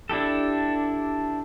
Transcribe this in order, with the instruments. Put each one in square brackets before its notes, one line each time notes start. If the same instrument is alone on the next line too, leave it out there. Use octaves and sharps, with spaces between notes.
[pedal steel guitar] D4 E4 G4 A4